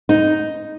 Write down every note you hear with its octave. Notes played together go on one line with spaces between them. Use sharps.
D#4